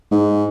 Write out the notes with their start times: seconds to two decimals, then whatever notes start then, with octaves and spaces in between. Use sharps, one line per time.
0.11 G#2